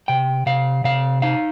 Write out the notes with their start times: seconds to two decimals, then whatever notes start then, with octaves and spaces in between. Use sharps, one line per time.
0.08 C3 G5
0.46 C3 F5
0.84 C3 F5
1.22 D#4 F5